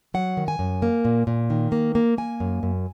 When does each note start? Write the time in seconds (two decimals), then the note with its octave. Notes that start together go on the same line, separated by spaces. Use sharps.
0.14 F#3 F#5
0.37 D#3
0.48 G#5
0.59 F#2
0.82 A#3
1.05 A#2
1.27 A#2
1.50 D#3
1.72 A#3
1.95 A#3
2.18 A#3 G#5
2.40 F#2
2.63 F#2